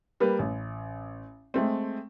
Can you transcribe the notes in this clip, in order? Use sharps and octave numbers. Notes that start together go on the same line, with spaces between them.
G3 A#3 A#4 B4
A1
G#3 A3 C4